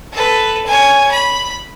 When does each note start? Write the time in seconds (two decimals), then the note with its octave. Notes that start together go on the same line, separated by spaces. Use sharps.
0.12 A4 B4
0.66 C#5 G#5
1.11 B5